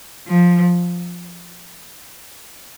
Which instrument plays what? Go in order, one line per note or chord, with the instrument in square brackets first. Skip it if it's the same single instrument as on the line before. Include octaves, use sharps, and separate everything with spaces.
[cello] F3